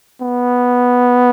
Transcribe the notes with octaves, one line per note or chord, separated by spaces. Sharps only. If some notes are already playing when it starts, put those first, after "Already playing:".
B3